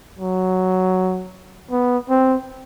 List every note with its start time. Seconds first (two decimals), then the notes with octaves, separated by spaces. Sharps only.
0.19 F#3
1.71 B3
2.10 C4